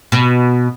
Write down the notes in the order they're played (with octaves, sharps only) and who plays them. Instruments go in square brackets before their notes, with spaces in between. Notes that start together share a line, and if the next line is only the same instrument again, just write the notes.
[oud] B2